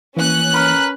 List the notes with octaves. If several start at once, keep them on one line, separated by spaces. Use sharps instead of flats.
E3 A#3 C#4 F#6
A#4 B4